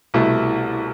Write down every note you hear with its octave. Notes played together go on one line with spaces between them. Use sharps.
C2 B2 A3 E4